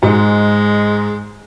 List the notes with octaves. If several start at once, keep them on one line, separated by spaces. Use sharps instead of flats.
G#2 G#3